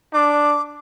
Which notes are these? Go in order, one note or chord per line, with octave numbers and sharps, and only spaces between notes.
D4 D6